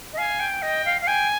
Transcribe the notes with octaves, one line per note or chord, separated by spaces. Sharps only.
D#5
F5 G#5
G5
D#5 G5
F5
F5
G5 G#5